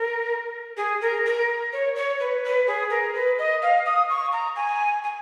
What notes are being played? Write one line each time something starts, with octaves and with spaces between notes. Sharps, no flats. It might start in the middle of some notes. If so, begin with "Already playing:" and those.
Already playing: A#4
G#4
A#4
A#4
C#5
C#5
B4
B4
G#4
A#4
B4
D#5
F5
D#6
C#6
A#5
G#5
G#5